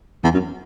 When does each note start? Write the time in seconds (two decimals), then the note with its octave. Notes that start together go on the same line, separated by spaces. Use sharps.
0.23 E2
0.34 F#2